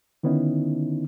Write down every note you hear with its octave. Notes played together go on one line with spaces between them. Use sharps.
D3 D#3 B3 C#4 D#4 E4